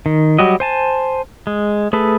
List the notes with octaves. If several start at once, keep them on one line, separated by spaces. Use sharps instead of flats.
D#3
F#3 G3 F#4 G4 D#5
C5 G#5 A5
G#3
A3 G#4 A4 B4